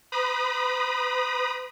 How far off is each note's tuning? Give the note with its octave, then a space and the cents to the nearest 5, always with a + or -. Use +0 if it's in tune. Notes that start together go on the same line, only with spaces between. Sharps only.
B4 +40 B5 -45 D#6 -20